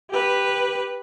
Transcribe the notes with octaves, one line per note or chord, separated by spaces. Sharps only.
G4 B4